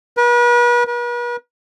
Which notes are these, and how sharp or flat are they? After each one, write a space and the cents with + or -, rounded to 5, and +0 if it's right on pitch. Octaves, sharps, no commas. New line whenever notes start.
B4 -40
B4 -45